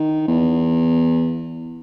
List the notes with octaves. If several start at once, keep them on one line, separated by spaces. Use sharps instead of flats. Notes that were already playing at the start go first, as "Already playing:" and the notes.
Already playing: D#3
E2